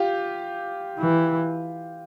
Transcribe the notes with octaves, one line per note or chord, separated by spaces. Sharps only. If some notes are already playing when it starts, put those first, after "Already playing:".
Already playing: F4 G4
E3